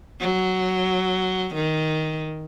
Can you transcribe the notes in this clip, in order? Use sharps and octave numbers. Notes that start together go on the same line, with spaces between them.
F#3
D#3